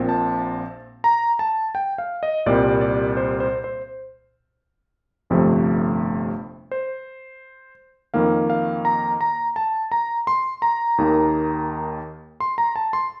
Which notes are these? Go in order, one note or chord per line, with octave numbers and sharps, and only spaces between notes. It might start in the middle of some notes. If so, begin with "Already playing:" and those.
Already playing: A#1 A#2 F3 C4
A5
A#5
A5
G5
F5
D#5
C2 A#2 G3 C4 D5
D5
C5
C5
C5
G1 F2 C3 F3 A3
C5
F2 D#3 A#3 F5
F5
A#5
A#5
A5
A#5
C6
A#5
D#2 D#3 A#3
C6
A#5
A5
C6